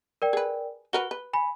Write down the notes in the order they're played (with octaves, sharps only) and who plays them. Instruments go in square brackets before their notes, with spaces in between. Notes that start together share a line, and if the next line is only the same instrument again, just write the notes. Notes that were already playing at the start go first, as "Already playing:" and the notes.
[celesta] A#4 D5 G5
[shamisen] G#4 B4
[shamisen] F#4 A#4 B4 [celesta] G7
[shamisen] B4
[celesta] G#5 B5